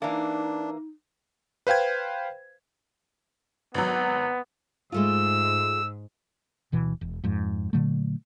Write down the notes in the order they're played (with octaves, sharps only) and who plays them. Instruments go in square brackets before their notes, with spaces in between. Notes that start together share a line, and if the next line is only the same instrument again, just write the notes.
[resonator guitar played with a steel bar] E3 A#3 [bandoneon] D4 [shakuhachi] D#4
[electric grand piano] B4 C5 F5 G5 G#6
[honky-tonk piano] G#1 F#3 [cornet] B3
[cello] G#2 [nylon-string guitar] G#3 A3 F4 [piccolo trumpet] E6
[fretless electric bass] D1 B2 E3
E1
F2 G#2
A#2 D3 F#3 A3